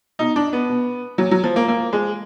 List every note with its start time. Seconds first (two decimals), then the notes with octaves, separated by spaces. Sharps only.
0.19 B2 D#4
0.36 D4
0.53 B3
0.69 B2
1.18 A#2 F#3
1.31 F#3
1.44 F3
1.56 A#3
1.68 A#2 A#3
1.93 F3 G#3